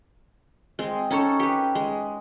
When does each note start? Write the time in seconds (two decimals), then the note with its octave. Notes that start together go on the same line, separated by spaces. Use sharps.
0.79 G#3 C4
1.11 C#4 D#4 A4 C#5
1.40 G4 B4
1.75 G#3